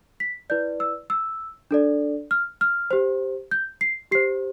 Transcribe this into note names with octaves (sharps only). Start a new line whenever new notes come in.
B6
E4 B4 D5 G6
E6
E6
D4 A4 D5
F6
F6
G4 C5
G6
C7
G4 C5 C7